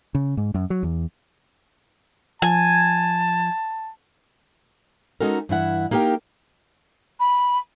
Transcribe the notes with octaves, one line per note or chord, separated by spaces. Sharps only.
C#3
G#2
F#2
F#3
E2
F3 G#5 A5
G#3 C#4 D#4 F#4 A4 A#4
G2 E3 E4 F#5
A#3 D#4 G4 A#4 G5
B5